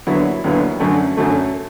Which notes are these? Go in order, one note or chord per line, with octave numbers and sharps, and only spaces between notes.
D#2 D3 F#3 B3 E4
D#2 D3 F#3 B3 E4
F#2 D3 F#3 A3
F#2 D3 F#3 A3